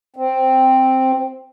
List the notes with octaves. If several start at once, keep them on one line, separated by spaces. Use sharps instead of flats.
C4